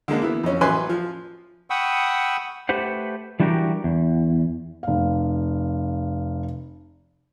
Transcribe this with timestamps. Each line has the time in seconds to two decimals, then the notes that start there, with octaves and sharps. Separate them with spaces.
0.08 D3 G#3 A#3 D4
0.22 E3 B3 E4
0.43 F2 C#4
0.61 A1 F#3 B4 G#5 C6
0.89 F3
1.70 F#5 G5 B5 C#6 D#6 E6
2.69 A3 G4 B4 C5 F#5
3.40 E3 G3 D4 F#4 G4 A#4
3.84 E2
4.83 F1 F5